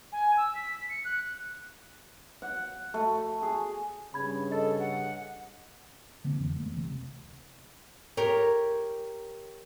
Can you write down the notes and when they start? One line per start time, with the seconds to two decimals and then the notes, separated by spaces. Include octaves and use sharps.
0.12 G#5
0.37 E6
0.55 B6
0.89 C#7
1.04 F#6
2.42 F#5
2.94 A3
3.43 G#4
4.14 G2 C#3 B5 G#6
4.51 A4 D#5 A6
4.80 F#5
6.24 D3 E3 A#3 C4
6.39 F2 D3
6.56 F2 E3 A3 A#3
6.76 C#2 C3
8.17 G4 A#4 C#5